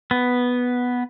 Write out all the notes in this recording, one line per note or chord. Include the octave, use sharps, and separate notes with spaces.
B3